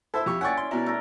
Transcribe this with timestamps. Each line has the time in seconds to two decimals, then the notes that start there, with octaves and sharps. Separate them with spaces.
0.14 E4 A4 C5 E5
0.26 F2 G4 C#6
0.41 C#4 D5 F#5 G5 C#6
0.57 C6
0.71 B2 E4 A#4
0.86 A3 A#4